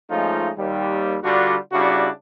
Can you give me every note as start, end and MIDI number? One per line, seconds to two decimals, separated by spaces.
0.10 0.49 53
0.10 0.49 56
0.10 0.49 57
0.10 0.49 61
0.10 0.49 63
0.10 0.49 65
0.58 1.16 39
0.58 1.16 55
1.23 1.56 50
1.23 1.56 55
1.23 1.56 62
1.23 1.56 65
1.23 1.56 66
1.72 2.08 49
1.72 2.08 55
1.72 2.08 62
1.72 2.08 64
1.72 2.08 66